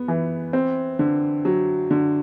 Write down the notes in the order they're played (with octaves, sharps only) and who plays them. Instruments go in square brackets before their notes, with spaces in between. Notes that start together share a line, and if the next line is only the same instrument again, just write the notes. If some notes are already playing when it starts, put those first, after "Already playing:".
Already playing: [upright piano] B3
E3
C4
D3
F#3
D3